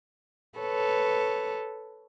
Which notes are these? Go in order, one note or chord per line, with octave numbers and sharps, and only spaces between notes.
A4 B4 C#5